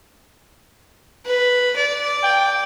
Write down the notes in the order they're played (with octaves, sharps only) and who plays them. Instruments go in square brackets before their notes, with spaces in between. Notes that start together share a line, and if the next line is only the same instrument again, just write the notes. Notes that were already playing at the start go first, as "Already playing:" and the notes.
[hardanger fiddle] B4
D5
[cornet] G5